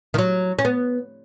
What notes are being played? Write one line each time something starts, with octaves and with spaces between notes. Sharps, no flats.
D#3
F#3
C#4
B3